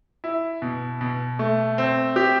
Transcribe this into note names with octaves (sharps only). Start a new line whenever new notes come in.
E4
B2
B2
A3
C4
G4